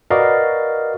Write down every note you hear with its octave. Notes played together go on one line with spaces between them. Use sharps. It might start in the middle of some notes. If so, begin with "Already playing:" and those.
F#4 A#4 B4 D5 D#5 F5